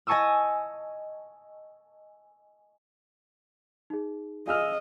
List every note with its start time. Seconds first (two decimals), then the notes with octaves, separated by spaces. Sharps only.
0.07 D#5 G#5 A5 C#6 D#6 E6
3.90 D#4 G#4
4.48 G#4 D#5 F5 E6 F6